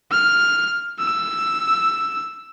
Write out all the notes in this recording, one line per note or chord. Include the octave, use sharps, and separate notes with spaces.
F6
E6